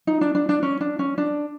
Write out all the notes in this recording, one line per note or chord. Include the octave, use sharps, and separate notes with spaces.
D#4
D4
D4
D4
C#4
D4
C#4
D4